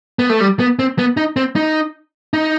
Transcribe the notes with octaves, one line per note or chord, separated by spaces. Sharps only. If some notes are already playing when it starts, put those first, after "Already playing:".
B3
A3
G3
B3
C4
B3
D#4
C4
D#4
D#4